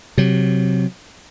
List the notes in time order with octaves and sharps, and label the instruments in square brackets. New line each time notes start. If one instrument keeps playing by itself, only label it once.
[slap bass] C3 F#3